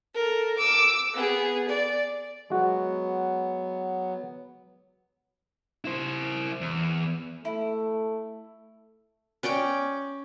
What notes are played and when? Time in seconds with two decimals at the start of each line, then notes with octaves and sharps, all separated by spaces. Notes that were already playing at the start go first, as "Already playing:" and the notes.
0.15 A4 A#4
0.58 D6 E6
1.13 B3 G#4
1.68 D5
2.50 F#3 G#3 B3 F#4
5.85 E4 C5
6.61 E2
7.45 A3 E4
9.43 C#4 D5 G5 D6